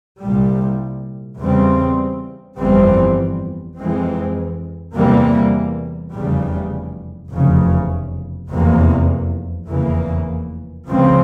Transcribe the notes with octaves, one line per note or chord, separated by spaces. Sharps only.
C2 A#2 G3
E2 C#3 G3 C4
G1 F2 E3 G3 C4
F2 E3 G#3 C4
E2 C3 E3 G3 A#3
F1 E2 C#3 G3
F1 E2 C#3
F1 E2 C3 E3 A#3
F1 E2 C#3 E3 A#3
C#2 C#3 F3 C4